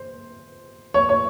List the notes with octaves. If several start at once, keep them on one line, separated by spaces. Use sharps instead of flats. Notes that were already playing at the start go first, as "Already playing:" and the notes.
Already playing: C5
C#5
C#5